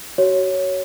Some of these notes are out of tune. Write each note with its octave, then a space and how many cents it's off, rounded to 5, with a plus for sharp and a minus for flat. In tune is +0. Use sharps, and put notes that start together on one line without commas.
F#4 +30 C#5 +0